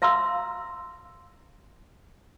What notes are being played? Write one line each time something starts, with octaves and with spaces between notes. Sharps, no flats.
E5 F5 A#5 C6 E6